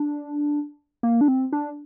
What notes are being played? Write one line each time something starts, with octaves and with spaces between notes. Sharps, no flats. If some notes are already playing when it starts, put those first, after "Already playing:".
Already playing: D4
A#3
D4
C4
D4